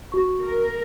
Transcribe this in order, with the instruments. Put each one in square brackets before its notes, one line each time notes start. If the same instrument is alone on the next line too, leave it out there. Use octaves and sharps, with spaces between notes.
[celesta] F#4 C#6
[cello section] A#4